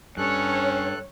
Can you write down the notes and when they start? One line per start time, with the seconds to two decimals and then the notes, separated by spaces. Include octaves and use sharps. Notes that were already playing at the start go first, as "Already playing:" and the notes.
0.17 G2 C#4 A4 C#5 F#6